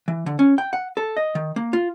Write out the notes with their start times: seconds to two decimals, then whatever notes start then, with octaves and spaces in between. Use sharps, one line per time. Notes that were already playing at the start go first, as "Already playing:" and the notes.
0.08 E3
0.26 D3
0.39 C#4
0.58 G5
0.73 F#5
0.97 A4
1.17 D#5
1.35 D#3
1.56 A#3
1.73 F4